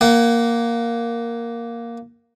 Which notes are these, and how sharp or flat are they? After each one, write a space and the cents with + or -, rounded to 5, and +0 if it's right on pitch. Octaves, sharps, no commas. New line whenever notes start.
A#3 +0 F#5 +30